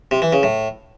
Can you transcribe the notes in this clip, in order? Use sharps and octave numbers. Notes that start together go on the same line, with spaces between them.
C3
E3
C#3
A2